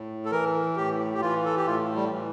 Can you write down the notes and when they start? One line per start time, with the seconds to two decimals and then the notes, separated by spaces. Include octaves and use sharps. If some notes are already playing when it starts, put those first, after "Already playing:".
Already playing: A2
0.25 A4
0.31 E3 A#4
0.76 A2 G4
1.15 G4
1.21 E3 F4
1.45 A4
1.56 G4
1.66 A2 F4
1.96 G3
2.11 E3